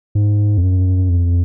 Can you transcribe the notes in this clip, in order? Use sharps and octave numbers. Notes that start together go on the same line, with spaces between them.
G#2
F2
F#2
F2